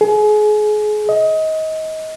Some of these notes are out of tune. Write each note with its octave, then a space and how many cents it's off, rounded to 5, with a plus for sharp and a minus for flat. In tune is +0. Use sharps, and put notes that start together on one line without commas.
G#4 +30
D#5 +25